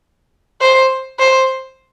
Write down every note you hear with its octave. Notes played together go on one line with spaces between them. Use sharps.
C5
C5